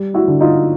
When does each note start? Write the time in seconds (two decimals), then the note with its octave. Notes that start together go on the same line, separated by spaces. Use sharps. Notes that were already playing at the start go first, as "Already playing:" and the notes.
Already playing: G3
0.14 E4 F#4
0.28 D3
0.40 D#4 F4